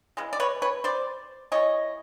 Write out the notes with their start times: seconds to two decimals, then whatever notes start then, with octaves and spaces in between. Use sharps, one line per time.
0.17 C#3 E3 G#3
0.33 D5
0.40 B4 C#5
0.62 B4 C#5
0.84 C5 D5
1.52 E3 G3 C#5 D#5